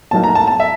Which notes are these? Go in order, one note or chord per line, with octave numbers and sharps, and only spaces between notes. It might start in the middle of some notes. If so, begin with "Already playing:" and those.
A2 F#3 A#3 D#4 A5
A#5
A5
A5
E5